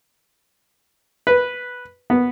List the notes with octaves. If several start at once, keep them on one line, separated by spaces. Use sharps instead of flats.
B4
B3